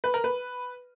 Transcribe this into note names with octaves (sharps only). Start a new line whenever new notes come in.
B4
A#4
B4